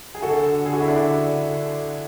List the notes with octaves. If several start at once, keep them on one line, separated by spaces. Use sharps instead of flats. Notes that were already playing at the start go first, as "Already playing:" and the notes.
G#4
D3 F#4 A4
G#4
F#4
E4
D4 F#4